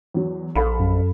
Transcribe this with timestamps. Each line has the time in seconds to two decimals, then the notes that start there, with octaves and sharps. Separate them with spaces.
0.14 E2 F#3
0.55 A#1 A4 F5 B5
0.80 F#2